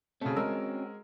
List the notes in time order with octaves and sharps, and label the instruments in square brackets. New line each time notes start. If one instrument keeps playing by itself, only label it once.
[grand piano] C#3 A3 [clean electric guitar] C4 C#4 F#4
[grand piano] G#3 A#4 E6